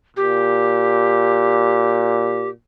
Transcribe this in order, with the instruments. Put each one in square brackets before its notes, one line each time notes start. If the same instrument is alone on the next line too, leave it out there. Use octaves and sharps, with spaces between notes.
[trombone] A#2 [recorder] G4